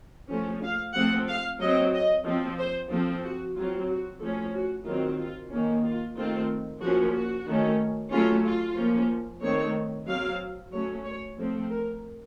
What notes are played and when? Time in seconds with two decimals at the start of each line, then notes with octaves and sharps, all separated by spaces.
0.29 F3 A3 C#4
0.62 F5
0.95 F3 A3 C4 F#5
1.28 F5
1.60 F#3 C4 D#5
1.93 D#5
2.25 F3 C4
2.58 C5
2.90 F3 C4 A4
3.23 F#4
3.55 F#3 C4 F4
3.88 F#4
4.20 F3 A3 C#4 A4
4.54 F#4
4.85 D#3 F#3 C4 F4
5.18 F4
5.50 D#3 A#3 C#4
5.84 F4
6.16 D#3 A3 C4 F4
6.81 F3 A#3 C#4 F#4
7.14 F#4
7.47 D#3 A3 C#4
8.11 F#3 A3 C#4 F4
8.44 F4
8.77 F3 A#3 C#4
9.41 D#3 A3 C4 C#5
10.07 F#3 C4 F5
10.72 F#3 A3 C#4 C#5
11.04 C#5
11.38 F3 A3 C4
11.70 A#4